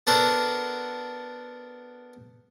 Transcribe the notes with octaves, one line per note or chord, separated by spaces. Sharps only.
B3 D4 F#4 A4 A#4 C5